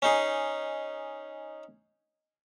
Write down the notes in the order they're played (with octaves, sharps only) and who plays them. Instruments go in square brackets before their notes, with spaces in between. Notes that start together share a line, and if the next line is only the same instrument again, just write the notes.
[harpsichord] C#4 D#4 G#4